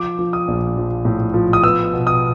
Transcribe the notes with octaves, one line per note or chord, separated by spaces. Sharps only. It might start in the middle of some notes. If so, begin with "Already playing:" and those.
Already playing: F3 D6
F3
D#6
A#1
F3
A2
F3
D#6
B3 E6
B2
D#6